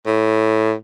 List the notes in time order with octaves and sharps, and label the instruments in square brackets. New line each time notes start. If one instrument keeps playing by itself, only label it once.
[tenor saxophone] A2